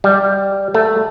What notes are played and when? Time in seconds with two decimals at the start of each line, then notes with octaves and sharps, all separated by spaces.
0.04 G3
0.74 A3